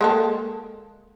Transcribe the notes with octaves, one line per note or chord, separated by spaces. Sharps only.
G#3 A#3 A4